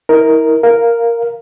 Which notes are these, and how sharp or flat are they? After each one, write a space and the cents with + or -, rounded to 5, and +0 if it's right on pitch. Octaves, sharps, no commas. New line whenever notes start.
E4 -35 A#4 +0
A#4 +0 F5 +0